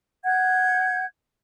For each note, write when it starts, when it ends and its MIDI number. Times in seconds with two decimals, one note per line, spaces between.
0.24 1.04 78
0.24 1.04 91
0.24 1.04 92